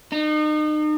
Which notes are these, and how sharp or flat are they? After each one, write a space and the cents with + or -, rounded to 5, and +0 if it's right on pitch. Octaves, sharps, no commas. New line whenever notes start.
D#4 -35